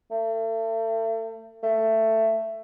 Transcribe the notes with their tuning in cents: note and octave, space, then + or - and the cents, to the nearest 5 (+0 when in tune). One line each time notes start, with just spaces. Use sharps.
A3 +35
A3 +15